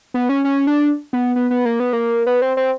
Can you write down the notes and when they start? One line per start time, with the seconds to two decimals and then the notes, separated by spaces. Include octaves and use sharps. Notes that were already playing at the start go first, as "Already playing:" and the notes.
0.14 B3
0.29 C#4
0.44 C#4
0.67 D4
1.13 B3
1.36 B3
1.51 B3
1.65 A#3
1.80 B3
1.93 A#3
2.26 B3
2.42 C4
2.57 C4